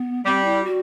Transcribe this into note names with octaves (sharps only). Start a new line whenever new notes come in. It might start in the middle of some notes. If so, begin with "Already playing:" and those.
Already playing: B3
G3 C4
E4
F#4